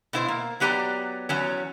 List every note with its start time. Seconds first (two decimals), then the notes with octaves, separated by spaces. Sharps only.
0.13 B2 E4 C5
0.28 A#3
0.60 F#3 B3 G4 D5 A#5
1.29 E2 F#3 C#4